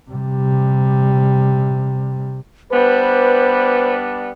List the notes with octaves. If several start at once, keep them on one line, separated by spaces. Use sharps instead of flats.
C3 G3
G3 B3 D4 B4 C5